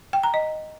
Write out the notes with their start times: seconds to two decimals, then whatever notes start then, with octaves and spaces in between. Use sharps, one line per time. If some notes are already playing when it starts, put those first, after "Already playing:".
0.13 G5
0.23 A#5
0.34 D#5